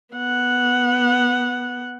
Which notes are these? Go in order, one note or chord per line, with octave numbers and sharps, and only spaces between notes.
B3 F#5